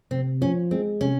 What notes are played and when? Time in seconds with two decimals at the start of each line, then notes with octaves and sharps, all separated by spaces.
0.11 C3 C4
0.41 F3 C#4
0.71 G#3 C4
1.01 C3 C#4